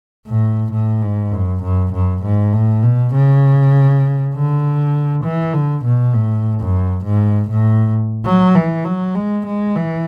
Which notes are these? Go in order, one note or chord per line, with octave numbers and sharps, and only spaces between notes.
A2
A2
G#2
F#2
F#2
F#2
G#2
A2
B2
C#3
D3
E3
D3
B2
A2
F#2
G#2
A2
F#3
E3
F#3
G#3
G#3
E3